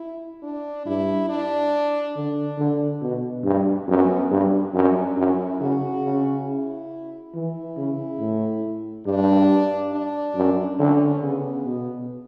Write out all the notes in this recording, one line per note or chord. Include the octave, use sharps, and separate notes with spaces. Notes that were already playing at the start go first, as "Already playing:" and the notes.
Already playing: E4
D4
G2 E4
D4
D3 D4
D3
B2
G2
F#2 B3
G2
F#2 D4
F#2 E4
C#3 F#4
C#3
E4
E3 E4
C#3
A2
G2 D4
D4
F#2
D3 C#4
C#3 B3
B2